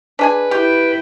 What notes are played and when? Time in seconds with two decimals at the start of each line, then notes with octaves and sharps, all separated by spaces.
0.19 D4 G#4 B4 G#5
0.51 E4 G4 G5